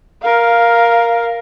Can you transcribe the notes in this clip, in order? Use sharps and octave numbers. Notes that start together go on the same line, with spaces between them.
A#4 F5